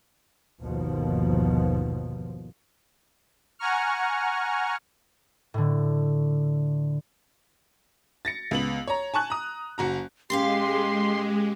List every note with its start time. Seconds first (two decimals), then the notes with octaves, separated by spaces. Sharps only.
0.60 G1 D#2 B2 F3
3.59 F#5 G#5 A#5 C#6 F6
5.54 A2 D3
8.25 A6 A#6 C#7
8.51 C#2 B3 F#7
8.88 C#5 A#5
9.14 G#5 A5 C#6 F#6
9.30 A#5 D#6
9.78 F#1 F#4 A#5
10.30 A#2 G#3 C#4 G4 F5 C6